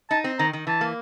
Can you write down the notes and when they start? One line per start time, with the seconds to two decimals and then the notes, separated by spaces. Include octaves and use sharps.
0.10 D#4 A5
0.24 C4
0.39 D#3 A#5
0.53 D#3
0.67 E3 A5
0.81 A#3